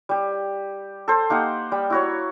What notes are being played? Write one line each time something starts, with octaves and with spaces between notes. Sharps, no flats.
G3 G4
A4 C5
A#3 D#4 G4 F#5
G3
E4 F#4 C#5